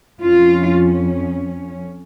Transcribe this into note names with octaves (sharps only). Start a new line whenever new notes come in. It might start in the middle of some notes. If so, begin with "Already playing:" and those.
F2 F3 C#4 F4